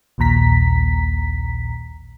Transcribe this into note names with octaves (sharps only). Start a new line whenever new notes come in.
A#1 D#2 A#2 A#5 B6